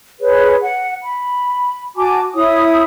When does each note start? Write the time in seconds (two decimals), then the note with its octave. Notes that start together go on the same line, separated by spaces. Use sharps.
0.20 G#4 B4 C#5
0.61 F#5
1.03 B5
1.97 F#4 G#5 A5 D6
2.34 E4 C#5 D#6